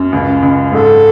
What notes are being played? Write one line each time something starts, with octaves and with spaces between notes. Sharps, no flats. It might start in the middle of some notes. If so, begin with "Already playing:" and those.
Already playing: F#2
C#2
C#2
G#2 A4